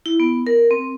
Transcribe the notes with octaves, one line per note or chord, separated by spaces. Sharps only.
E4
B3
A#4
C4